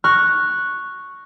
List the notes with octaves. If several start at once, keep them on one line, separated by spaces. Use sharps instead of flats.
C#6 F6 F#6 A#6